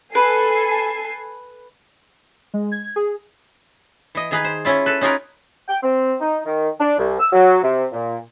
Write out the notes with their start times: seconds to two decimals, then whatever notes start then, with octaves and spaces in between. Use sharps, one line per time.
0.15 A4 B4 G#5 C7
2.54 G#3
2.72 G#6
2.96 G#4
4.15 E3 D#5
4.31 D#3 D#4 G#4 B4
4.44 C5
4.65 C#4 E4 F4
4.86 A4 B4
5.01 C#4 D#4 F4 G#4 A#4 B4
5.69 G5
5.83 C4
6.21 D#4
6.46 D#3
6.79 D4
6.99 C2
7.20 E6
7.33 F#3
7.63 C3
7.92 A#2